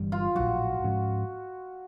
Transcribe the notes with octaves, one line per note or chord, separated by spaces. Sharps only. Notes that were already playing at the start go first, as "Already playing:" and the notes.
Already playing: G1 G2 E3 G3
F4
A#1 A2 F#3 F#4
G#2 F3 G#3 C#4